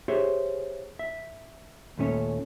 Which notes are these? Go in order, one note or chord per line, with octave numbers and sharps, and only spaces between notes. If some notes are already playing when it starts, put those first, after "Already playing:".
G4 G#4 C5 C#5 E5
E5
D#2 A#2 A3 C#4 C#5